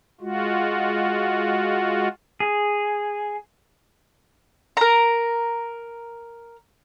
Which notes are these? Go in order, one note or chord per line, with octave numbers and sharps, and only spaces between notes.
G#3 F4 F#4
G#4
A#4 A#5